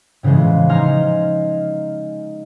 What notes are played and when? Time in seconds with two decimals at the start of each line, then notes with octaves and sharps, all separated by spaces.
0.23 A2 C#3 E3 F3 G#3
0.69 D#4 G#5 A#5 C6 F6